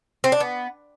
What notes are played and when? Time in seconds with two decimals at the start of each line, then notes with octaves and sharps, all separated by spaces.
0.24 C4
0.32 D4
0.40 B3